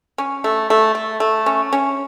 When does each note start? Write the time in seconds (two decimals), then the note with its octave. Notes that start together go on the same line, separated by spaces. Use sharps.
0.18 C#4
0.44 A3
0.70 A3
0.95 A3
1.20 A3
1.46 C#4
1.73 C#4